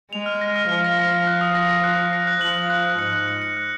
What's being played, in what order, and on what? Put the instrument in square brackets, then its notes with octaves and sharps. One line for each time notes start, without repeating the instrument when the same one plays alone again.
[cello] G#3 [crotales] F7
[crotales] F6
A#6
F6
[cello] F3 [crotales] F6
[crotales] A#6
F6
F6
F#6
D#6
A#6
A#6
F#6
F#6
A#6
F#6
[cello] F3 [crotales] F#7
[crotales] F#6
F#6
F#6
[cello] G#2 [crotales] C#7
[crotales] F#6
C#7
C#7
F#6